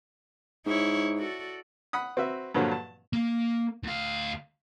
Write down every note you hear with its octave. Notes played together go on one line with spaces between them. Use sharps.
G#2 E4 C#5
F#4 A4 D5
F#5 B5 D#6
C4 F#4 B4 E5
G2 A#2 D3 F3 F#3
A5
A#3
D2 F5